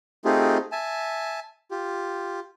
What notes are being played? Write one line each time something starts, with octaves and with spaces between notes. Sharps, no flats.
A3 C4 D#4 F4 G4 G#4
E5 G#5 A5
F4 G4